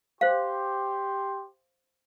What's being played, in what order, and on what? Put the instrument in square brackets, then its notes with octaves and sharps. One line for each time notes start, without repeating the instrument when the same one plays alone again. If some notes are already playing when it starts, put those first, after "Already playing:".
[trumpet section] G4 C6 [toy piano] C5 F5